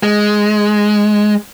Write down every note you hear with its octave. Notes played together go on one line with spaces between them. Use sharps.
G#3